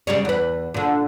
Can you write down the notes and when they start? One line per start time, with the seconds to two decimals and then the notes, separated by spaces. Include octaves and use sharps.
0.07 C#3 G3 C#4
0.25 E2 B4
0.74 A#2 D3